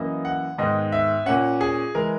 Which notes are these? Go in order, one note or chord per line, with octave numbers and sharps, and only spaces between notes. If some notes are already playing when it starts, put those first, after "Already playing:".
Already playing: F#2 E3 A#3 D#5
F#5
G#2 D#3 G#3 B3 D#5
E5
A#2 A#3 C#4 F#5
G#4
E3 G#3 A#4